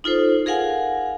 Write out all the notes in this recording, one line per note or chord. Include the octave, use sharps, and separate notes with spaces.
D#4 F4 A4 C5
G#4 A#4 F5 F#5 G#5